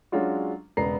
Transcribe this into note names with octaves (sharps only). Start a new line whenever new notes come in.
F#3 G#3 C#4 D4 F4 F#4
E1 C#3 B3 D5 A#5 C7